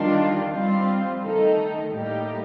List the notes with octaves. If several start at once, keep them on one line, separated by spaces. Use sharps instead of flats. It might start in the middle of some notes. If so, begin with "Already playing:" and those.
Already playing: D#3 G3 D4 F4
G3 C4 F4
D#3 A3 D#4 A4
A2 G3 A#3 D#4 G4